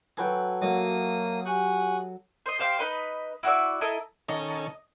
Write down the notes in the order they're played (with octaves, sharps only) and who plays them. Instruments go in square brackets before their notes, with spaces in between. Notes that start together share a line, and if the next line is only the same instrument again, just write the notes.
[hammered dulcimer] F#3 A4 [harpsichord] G#4 B4 G5
[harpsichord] F#3 [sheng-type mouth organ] A#3 D#6 [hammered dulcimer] E5
[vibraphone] G4 F#5 G#5 [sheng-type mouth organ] C#6 D#6 F#6
[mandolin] C5 D#5
G4 C5 F5 G5
D#4 B4 D#5
E4 F#4 D5 E6
E4 A4 D#5 A#5
[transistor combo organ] D#3 C#4 A4 [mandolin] D#5